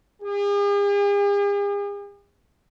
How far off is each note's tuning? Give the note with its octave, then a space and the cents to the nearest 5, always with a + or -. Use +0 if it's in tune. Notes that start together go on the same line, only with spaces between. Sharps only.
G#4 -45